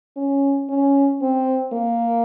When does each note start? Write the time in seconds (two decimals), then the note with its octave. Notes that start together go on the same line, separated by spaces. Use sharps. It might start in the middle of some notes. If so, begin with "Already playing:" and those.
0.17 C#4
0.69 C#4
1.22 C4
1.73 A#3